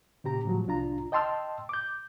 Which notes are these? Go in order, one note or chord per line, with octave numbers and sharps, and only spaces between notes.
A#2 C#3 G4 A#5
A2 F3 F#3
C2 D4 F4 A#5
D#5 G5 A5 C6 E6 F6
D6 G6